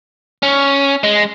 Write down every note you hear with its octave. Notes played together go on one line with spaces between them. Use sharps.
C#4
G#3